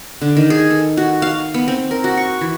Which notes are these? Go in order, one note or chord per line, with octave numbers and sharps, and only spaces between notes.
D3
D#3
G#4
A4
F#4
F5
B3
C4
A#4
F#4
C#6
E3